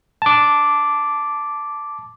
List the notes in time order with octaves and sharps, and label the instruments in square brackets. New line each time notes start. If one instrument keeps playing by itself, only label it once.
[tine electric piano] A5 D6